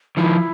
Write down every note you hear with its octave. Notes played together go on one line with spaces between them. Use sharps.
D#3 F3 E4